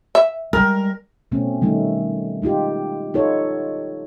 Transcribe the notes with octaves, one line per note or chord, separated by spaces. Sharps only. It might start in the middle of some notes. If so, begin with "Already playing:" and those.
E5
G3 G#3 A#4
B2 A3 C4 C#4
D#3 G3 A3 D#4
G#3 D#4 F4 G4
D#4 F4 A4 C#5